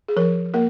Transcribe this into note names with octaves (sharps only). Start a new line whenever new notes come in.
G#4
F3 A#4
A#3 A#4